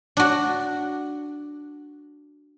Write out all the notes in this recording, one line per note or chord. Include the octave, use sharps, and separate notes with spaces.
D4 F#4